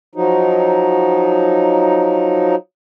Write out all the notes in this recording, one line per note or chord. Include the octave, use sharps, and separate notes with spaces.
F3 F#3 D#4